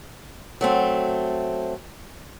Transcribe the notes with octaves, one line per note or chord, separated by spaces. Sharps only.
F#3 A3 C4